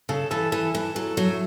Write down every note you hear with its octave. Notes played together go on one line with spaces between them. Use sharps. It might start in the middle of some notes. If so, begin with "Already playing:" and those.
C#3 A4
E3 A4
E3 A4
E3 A4
F#3 A4
F#3 A3